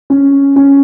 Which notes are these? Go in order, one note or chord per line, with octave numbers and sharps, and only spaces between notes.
C#4
C#4